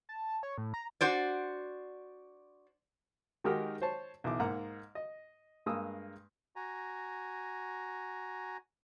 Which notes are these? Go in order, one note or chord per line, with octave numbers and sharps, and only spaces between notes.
A5
C#5
A2
A#5
D4 F#4 C5 D5
D#3 G#3 D#4 F#4 G4 A#4
C5 C#5 A5
B1 E3 D6
G#2 A#3 F#5 A#5
D#5
G2 G#3 A#3 D#6 E6
F#4 G#5 A#5